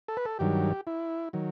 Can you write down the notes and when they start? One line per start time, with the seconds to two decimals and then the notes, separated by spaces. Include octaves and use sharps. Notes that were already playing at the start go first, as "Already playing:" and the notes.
0.08 A4
0.17 B4
0.25 A4
0.39 G2 D#3 F#3 G4
0.87 E4
1.33 D#3 F#3